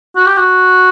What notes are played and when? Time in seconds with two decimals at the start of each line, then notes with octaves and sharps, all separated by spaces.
0.16 F#4
0.26 G4
0.37 F#4